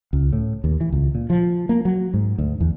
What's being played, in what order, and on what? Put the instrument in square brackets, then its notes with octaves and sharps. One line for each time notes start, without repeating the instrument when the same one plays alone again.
[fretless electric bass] C#2
A2
D#2
E3
C#2
A#2
F3
A#3
F#3
G#2
D2
E2